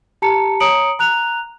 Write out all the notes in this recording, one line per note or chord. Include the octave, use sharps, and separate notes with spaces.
G4 A5 A#5 C#7
C#5 A#5 D#6 C#7 D7 F#7
A#5 F#6 F7